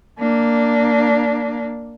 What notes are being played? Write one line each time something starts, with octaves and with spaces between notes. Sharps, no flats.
A#3 D4